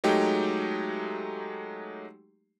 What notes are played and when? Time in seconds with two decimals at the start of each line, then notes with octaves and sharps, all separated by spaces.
0.04 F#3 G#3 A3 D#4 G4 G5